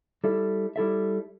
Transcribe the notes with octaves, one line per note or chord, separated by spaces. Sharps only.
G3 E4 A4 E5
G3 E4 A4 E5